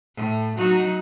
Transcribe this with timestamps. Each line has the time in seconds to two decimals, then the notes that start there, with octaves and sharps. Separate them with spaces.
0.16 A2
0.57 F#3 D#4 F#4